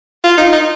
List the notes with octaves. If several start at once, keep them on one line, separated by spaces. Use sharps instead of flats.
F4
D#4
D#4